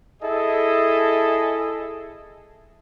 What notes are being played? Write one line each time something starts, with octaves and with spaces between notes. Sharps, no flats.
E4 G#4 A4 D#5 E5